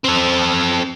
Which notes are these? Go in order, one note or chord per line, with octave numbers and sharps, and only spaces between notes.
C4 A4